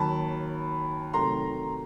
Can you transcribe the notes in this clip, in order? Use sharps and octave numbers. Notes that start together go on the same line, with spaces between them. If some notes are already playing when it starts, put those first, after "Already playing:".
Already playing: D#2 D#3 F#3 A5 B5
C3 D#3 F#3 A3 A#5 C6